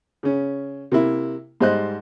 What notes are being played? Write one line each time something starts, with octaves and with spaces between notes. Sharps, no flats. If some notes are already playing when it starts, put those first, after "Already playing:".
C#3 C#4
C3 A#3 E4
G#2 G3 C5 D#5 F#6